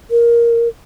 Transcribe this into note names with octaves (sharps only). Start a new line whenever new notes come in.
A#4